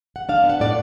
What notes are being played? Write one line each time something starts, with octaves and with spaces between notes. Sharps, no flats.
F#5
D4 F5
B3
F#5
A2 D5